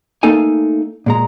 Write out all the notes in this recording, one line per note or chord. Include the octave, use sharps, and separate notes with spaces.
A3 A#3 D#4 A4 F5 G#5
A#2 G#3 A#5